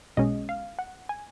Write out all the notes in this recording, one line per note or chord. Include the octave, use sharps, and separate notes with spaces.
B1 B2 G#3 C#4 D#5
F5
F#5
G#5